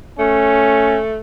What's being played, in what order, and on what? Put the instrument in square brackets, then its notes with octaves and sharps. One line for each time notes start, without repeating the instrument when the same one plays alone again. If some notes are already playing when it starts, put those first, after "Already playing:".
[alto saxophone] A3 [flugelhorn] C#4